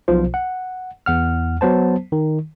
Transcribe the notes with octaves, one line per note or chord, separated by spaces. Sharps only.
B1 B2 F3 F4 C5
F#5
E2 F#5 F6
F#3 B3 C5 A5
D#3